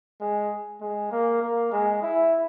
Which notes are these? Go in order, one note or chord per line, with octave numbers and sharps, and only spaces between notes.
G#3
G#3
A#3
A#3
G#3
E4